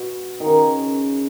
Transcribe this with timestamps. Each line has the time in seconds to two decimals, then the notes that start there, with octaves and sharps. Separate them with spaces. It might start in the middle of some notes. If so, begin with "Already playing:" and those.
Already playing: B2
0.40 D#3
0.46 C#3